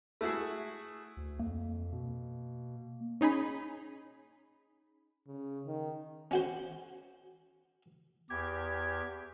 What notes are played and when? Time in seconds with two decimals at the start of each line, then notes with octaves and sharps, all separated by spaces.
0.21 A3 E4 F#4 G#4
1.17 D2
1.39 F2 A#3
1.92 B2
3.21 C#4 D#4 G#4 B5
5.27 C#3
5.66 D#3
6.31 C#4 F#4 C5
8.30 E2 G4 G#6